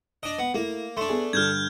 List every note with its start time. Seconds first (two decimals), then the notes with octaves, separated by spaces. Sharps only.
0.23 D4 D#5 D7
0.39 B3
0.54 A3 A#3 E4
0.97 A3 D4 C6
1.09 B3 G#4
1.33 G2 D3 F6 G6 G#6